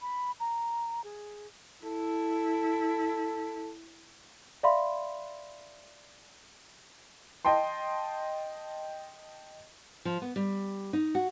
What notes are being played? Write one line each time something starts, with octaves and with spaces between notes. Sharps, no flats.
B5
A#5
G#4
E4 A4
D5 E5 F5 B5 C6
D#5 G5 A5 C6
F3
B3
G3
D#4
F#4